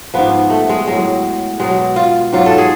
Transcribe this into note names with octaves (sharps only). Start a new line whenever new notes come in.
G#2 F3 B3
A3
G#3
A2 F#3 G#3
B2 F#3 G#3
F4
G#2 F#3 F4
A4
G#4